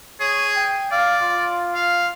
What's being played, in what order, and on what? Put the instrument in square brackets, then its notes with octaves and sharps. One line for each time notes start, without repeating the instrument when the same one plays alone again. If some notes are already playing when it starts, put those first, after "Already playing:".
[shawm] G#4 [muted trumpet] C#5
[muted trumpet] G5
[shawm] D5 [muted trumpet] F5
[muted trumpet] F4
[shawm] F5